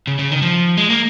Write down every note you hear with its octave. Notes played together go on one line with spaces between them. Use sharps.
C#3
C#3
D#3
F3
G#3
A#3